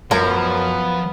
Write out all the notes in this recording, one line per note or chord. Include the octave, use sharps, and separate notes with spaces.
F#2 F3 B3 C#4 A#4